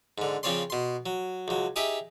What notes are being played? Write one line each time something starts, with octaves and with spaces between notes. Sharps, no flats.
G#2 D3
C#3 F3 C4 C#5 D5 C6
B2 C6
F#3
C#2 F#3
D#4 G4 G#4 E5 G5